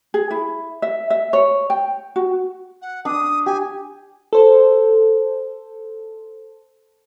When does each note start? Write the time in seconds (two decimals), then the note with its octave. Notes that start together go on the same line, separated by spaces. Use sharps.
0.14 G#4
0.31 E4
0.82 E5
1.10 E5
1.33 C#5
1.70 G5
2.16 F#4
2.82 F#5
3.05 D4 D#6
3.46 G4 G#5
4.33 A4 C5